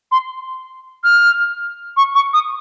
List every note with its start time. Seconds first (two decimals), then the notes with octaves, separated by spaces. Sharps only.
0.12 C6
1.04 F6
1.97 C#6
2.15 C#6
2.33 D#6